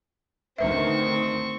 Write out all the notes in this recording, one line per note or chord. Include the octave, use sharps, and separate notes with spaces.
D2 D#3 C4 B4 E5 C#6